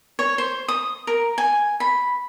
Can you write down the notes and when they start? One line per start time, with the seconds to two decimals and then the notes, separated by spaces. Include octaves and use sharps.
0.19 C#5
0.38 C5
0.68 D#6
1.07 A#4
1.38 G#5
1.80 B5